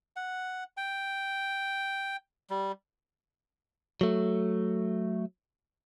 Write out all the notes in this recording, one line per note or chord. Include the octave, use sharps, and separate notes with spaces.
F#5
G5
G3
F#3 A3